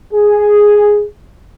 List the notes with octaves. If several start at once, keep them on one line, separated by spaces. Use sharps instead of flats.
G#4